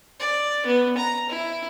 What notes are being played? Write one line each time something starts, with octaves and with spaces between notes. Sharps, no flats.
D5
B3
A#5
E4